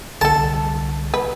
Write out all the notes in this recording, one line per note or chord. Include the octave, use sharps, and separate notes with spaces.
C2 D3 G3 A4 A#4 A5
B4